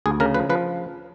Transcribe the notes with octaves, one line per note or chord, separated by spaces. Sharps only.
D2 G#4
C#3 A#4
F3 B4
F3 B4